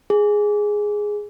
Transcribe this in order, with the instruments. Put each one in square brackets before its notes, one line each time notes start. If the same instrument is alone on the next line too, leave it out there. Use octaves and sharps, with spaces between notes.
[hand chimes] G#4